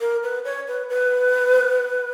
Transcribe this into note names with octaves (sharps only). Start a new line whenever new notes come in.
A#4
B4
C#5
B4
B4